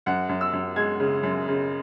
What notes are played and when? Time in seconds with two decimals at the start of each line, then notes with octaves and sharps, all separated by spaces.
0.06 F#2 F#5
0.29 F#2
0.41 E6
0.53 F#2
0.76 G#3 G#6
1.00 C#3
1.23 F#2
1.48 C#3